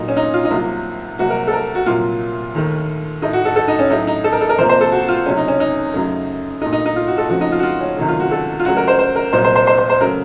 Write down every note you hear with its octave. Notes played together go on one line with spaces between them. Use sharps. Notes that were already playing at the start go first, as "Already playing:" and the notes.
Already playing: A#2 F#3 A3 D#4
C#4
D#4
F4
D#4
C2 C3 F#3 A#3 F4
C2 C3 F#3 A#3 F#4
A#4
A4
A#4
F#4
C2 A#2 F#3 F4
D#2 D#3 A3
A2 A3 D#4
F#4
A4
A4
D#4
C#4
A2 F#3 A3 D#4
D#4
A4
A#4
A4
A#4
F2 C3 F3 A#3 C5
C5
A4
F#4
F4
C#2 C3 F#3 A3 C#4
D#4
C#4
D#4
F#2 C#3 F#3 A3
A#2 A3 D#4
D#4
D#4
F4
F#4
A4
F2 C#3 F3 A3 F#4
D#4
F4
F#4
F4
C#4
C#2 C3 D#3 F#3 A3
F4
F#4
A4
F4
C#2 C#3 F#3 A3 F#4
A#4
C5
C5
A#4
C2 A#2 F#3 C5
C5
C5
C5
C5
C5
C#3 F#3 A3 A#4